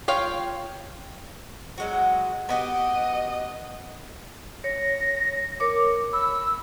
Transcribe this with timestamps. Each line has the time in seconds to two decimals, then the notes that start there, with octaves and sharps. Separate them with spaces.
0.08 F4 C#5 F5 G5
1.78 F#3 G#3 F#4
2.49 B3 F#4 G4 D#5
4.64 C#5 A#6
5.60 A#4 C#5 D6
6.13 B5 E6